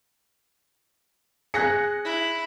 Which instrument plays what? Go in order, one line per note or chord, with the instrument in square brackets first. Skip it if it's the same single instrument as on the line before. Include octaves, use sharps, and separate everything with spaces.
[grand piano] G#4 [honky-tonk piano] F#6 A#6 C#7
[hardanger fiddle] E4